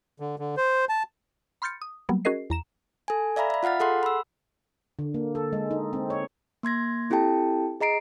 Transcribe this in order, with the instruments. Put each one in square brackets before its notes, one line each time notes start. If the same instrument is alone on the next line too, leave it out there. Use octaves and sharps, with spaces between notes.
[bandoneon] D3
D3
C5
A5
[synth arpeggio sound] B5 C6 F6 G6 A6 C#7
D#6
F#3 G3 A#3 B3
C#4 F#4 G#4 A#4 D#5 C7
E2 A#5 E7
[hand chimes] A4 G#5
D5 E5 F5 A#5 B5
E5 B5
F4 F5 F#5 F6 A6
G#4 A4 F#5 C6
B5 E6
[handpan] D3
A#3
A4
G#3
D#4
C4
C#5
[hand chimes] A#3 C6 G#6 A#6
C4 E4 G4 A4 G5 A5
G#4 D#5 A#5 C7 D7